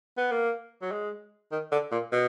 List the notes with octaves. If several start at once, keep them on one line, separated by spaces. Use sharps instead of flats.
B3
A#3
F#3
G#3
D#3
D3
A#2
B2